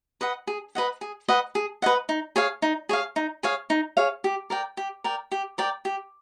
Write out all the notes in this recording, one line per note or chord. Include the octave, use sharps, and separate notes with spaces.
B4 D#5 F#5
G#4
B4 D#5 F#5
G#4
B4 D#5 F#5
G#4
B4 D#5 F#5
D#4
G#4 C#5 F5
D#4
G#4 C#5 F5
D#4
G#4 C#5 F5
D#4
G#4 C#5 F5
G4
A#4 D5 G5
G4
A#4 D5 G5
G4
A#4 D5 G5
G4